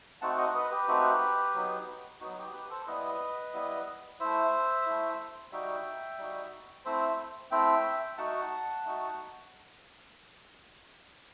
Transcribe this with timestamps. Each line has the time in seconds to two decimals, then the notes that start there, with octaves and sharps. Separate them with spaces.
0.21 A3 C4 D#4 F#4 F#5 A5
0.38 D#5 F#5
0.55 B4 D#5
0.71 G4 B4
0.88 A3 C4 D#4 F#4
1.54 F#3 B3 D#4
2.21 F#3 B3 D#4 F#4
2.38 G4
2.53 G4 B4
2.70 A4 C5
2.87 G3 B3 E4 B4 D#5
3.54 G3 B3 E4
4.20 A3 E4 C5 E5
4.86 A3 E4
5.52 G3 D#4 F#4 E5 G5
6.18 G3 D#4 F#4
6.85 A3 C4 E4 C5 E5
7.51 A3 C4 E4 E5 G5
8.17 A3 D#4 F#4 F#5 A5
8.84 A3 D#4 F#4